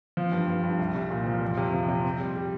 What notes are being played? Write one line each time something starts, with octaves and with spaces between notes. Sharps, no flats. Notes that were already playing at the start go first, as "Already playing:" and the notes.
F3
G2
G2
G2
C2
C2
A#2
F3
F2
C3
F3
C3
C4
G3
G3